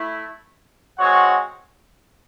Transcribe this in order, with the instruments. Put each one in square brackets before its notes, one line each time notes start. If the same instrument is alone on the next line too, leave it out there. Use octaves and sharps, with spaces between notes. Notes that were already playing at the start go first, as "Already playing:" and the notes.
Already playing: [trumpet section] A3 E4
G#3 C4 F#4 C#5 F#5